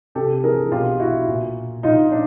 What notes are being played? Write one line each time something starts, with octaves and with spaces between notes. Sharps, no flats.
C3 G4 A4
E3 G#4 A#4
B2 F4 G4
E4 F#4
A#2
A#2 D#4 F4
D4